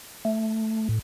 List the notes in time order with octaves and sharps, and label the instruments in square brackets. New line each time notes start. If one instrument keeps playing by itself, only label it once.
[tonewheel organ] A3
A2